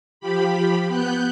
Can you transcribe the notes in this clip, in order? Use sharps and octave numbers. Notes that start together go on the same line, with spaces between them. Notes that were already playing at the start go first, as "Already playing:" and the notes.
F3 G4 B5
B3 F#6 G6